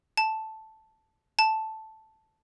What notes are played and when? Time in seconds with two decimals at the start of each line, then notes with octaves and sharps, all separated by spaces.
0.18 A5
1.39 A5